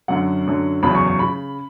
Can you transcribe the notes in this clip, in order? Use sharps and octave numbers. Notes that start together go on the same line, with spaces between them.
F#2 D3 F#3 F#5
F#2 D3 F#3
E2 C#3 F#3 B5
C#6
C#6
C#3 B5